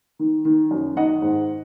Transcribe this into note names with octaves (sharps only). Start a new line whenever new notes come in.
D#3
D#3
F#2
D#3 D#5 F#5
G#2